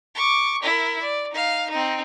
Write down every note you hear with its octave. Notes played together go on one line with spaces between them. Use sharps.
C#6 D6
E4 A#4
D5
D#4 F5
C4 D#4